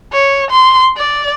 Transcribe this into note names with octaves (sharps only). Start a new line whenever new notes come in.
C#5
C6
D5